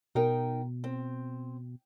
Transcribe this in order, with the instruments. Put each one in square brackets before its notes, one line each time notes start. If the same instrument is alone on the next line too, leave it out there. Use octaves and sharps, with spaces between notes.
[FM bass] B2 [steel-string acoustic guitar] D#4 A#4 G5
[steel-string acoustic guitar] C4